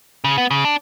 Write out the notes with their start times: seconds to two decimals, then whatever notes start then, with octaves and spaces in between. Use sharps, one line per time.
0.24 C#3
0.38 B3
0.51 C#3
0.65 D4